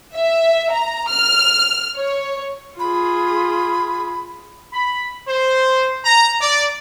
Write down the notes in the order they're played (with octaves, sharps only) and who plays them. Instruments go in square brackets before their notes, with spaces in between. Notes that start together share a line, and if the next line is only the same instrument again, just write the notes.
[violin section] E5
A#5
F6
C#5
[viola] F4 G#4 [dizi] B5
[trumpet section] B5
C5
A#5
D5